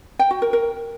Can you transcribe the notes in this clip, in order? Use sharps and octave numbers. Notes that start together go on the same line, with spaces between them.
G5
F#4
A#4
A#4